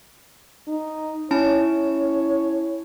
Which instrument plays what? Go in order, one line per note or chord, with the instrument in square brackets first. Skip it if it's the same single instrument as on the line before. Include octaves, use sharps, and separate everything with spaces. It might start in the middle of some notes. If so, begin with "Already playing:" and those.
[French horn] D#4
[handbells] C#4 E4 A5 [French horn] C#5